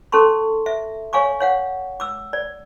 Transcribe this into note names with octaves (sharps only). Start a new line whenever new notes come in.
C#4 A4 A5 C6 C#6
E5
C#5 F5 G#5 C#6 D6
C#5 F5 F#5
D6 E6
D5